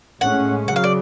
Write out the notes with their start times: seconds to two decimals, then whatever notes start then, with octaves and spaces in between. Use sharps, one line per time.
0.21 A2 G#3 C#4 F#5
0.68 C#3 F#3 F#5
0.76 F5
0.84 D5